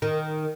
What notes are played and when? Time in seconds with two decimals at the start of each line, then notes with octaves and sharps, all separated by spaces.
0.02 D#3